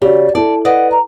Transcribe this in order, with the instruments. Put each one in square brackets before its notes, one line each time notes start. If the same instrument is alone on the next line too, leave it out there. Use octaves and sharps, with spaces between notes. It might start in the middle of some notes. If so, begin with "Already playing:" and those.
[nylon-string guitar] C#3 [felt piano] F#4 G4 [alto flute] D5
[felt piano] E4 A4 [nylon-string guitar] D5 [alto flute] A5
[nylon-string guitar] B4 D5 D#5 [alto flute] F#5
[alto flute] A#5